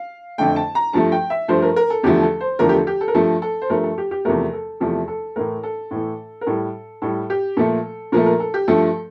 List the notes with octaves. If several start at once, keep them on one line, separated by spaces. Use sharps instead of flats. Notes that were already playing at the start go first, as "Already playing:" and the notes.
Already playing: F5
F2 D3 A3 G5
A5
A#5
G2 F3 A3 A5
G5
E5
G2 F3 A3 C5
A#4
A#4
A4
E2 D3 F3 A3 G4
A4
C5
E2 D3 F3 A3 A#4
G4
A4
G4
A4
A#4
G2 F3 A3 A4
A4
C5
G2 F3 A3 A#4
A4
G4
G4
E2 C3 F3 A3 A#4
A4
E2 C3 F3 A3 A4
A4
A2 E3 A3 A#4
A4
A2 E3 A3
A#4
A2 G3 A4
A2 G3 A4
G4
A#2 F3 A3 A4
A#2 F3 A3 A#4
A#4
A4
G4
G2 F3 A3 A4